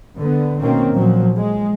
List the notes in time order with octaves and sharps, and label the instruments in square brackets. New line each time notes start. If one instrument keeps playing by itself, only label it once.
[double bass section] D3 B3
B2 D#3 A#3 C4 C#4
A#2 F3 F#3
G#3